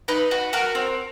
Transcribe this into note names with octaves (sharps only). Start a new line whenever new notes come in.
D#4 B4
F#4
F#4 A#4
C4